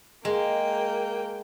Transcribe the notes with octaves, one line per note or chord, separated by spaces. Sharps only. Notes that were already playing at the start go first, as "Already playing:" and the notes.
G#3 A#3 G5